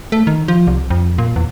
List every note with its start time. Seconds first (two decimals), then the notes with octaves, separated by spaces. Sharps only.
0.12 A3
0.27 D#3
0.48 F3
0.67 C2
0.90 F2
1.18 A#2
1.36 E2